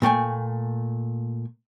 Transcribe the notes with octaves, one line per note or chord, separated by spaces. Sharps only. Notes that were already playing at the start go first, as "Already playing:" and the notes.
A#2 A3 G5 G#5